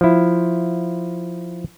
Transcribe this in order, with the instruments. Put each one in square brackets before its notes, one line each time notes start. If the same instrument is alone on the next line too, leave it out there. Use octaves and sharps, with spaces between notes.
[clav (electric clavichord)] F3 E4